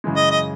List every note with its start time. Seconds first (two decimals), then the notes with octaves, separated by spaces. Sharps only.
0.04 F#2 C#3 E3 G#3
0.16 D#5
0.31 D#5